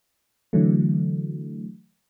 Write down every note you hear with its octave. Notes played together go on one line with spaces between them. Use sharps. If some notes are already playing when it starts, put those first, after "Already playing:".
D3 E3 F#3 A3